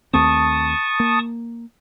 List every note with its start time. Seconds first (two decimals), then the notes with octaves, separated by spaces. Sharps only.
0.14 D#2 A3 C4 A5 C#6 D#6
1.00 A#3